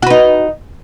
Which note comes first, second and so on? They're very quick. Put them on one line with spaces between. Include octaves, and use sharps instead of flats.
F#4 B4 D#4